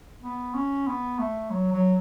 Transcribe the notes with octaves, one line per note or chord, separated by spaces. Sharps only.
B3
C#4
B3
A3
F#3
F#3